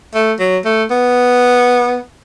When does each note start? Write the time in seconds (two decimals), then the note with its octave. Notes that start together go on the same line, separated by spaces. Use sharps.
0.15 A3
0.39 F#3
0.65 A3
0.91 B3